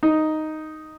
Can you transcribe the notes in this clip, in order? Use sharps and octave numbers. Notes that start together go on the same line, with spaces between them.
D#4